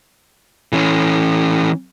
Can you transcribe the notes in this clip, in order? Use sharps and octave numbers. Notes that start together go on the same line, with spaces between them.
E3 C#4